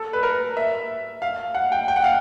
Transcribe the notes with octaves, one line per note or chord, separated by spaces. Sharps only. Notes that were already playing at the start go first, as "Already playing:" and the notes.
Already playing: A4
B4
A#4
E5
F5
F#5
G5
G5
F#5
F5